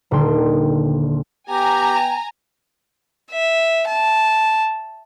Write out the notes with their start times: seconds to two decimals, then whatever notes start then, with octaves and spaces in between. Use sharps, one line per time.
0.11 D#1 D3 D#3 G5 C6
1.50 B3 G4 G5 G#5 A#5
3.31 E5
3.87 A5